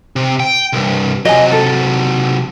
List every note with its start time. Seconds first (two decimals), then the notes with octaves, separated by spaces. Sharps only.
0.16 C3
0.40 G5
0.73 C2 G2
1.25 C3 F#3 D#5 G#5
1.52 A4